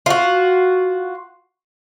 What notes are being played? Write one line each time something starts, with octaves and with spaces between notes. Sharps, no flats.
F4 F#4